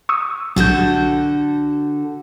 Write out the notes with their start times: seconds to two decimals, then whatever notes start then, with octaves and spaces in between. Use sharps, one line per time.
0.09 C#6 D#6 E6
0.56 B1 D3 F#4 A4 G6